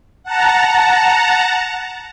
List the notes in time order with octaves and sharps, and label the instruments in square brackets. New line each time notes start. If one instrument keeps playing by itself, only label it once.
[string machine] F#5 A5 A#5